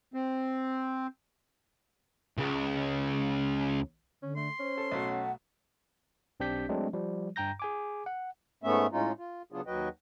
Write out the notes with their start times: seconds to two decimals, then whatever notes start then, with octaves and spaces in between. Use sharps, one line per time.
0.14 C4
2.38 C#2 C#3
4.23 D3 C#4
4.36 A3 C6
4.59 C#4 C5
4.78 A4
4.92 B1 A3 F#4
5.09 F#5
6.40 B1 C4 D4 G4 G6 B6
6.69 F#3 G#3 A3 C4 D4
6.93 F3 G3
7.36 G2 G5 A#5 G6 A#6
7.60 G#4 G#5 D6
8.06 F#5
8.63 G#2 A3 B3 C#4 E5
8.92 A2 G#3 C#4 D#4 F4
9.18 F4
9.52 C#3 F#3 B3 D4 F4 G#4
9.67 D#2 F#3 F#4 B4 D#5 G5